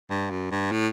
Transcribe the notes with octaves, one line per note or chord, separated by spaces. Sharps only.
G2
F#2
G2
A2